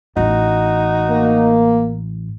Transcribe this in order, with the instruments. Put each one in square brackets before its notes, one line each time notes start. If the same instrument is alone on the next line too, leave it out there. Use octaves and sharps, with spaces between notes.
[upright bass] A1 A2 [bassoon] D#4 [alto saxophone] F#4
[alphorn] A#3